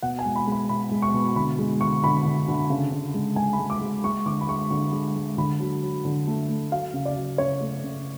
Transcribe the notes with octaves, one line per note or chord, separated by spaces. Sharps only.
B2 F#5
G#5
G#3
B5
G#3
B5
B2 B5
G#3
C#6
B2
D3 B5
G#3
D3 C#6
D3 B5
D3
D3
C#3
C#3
G#3
G#3 G#5
B5
G#3
D6
G#3
G#3 C#6
D3 D6
B5
G#3 C#6
D3 C#6
G#3
G#3
D3 B5
F#3
F#3
D3
A3
A3
F#3 F5
C#3
D5
F#3
C#3 C#5
A3
C#3